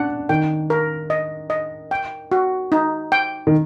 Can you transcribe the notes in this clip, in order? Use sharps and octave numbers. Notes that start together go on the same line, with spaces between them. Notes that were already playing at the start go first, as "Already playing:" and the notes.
Already playing: D4 F#5
D#3 G5
A#4
D#5
D#5
G5
F#4
D#4
G5
D#3